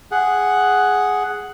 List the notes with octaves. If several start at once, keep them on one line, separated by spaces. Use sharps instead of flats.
G#4 F#5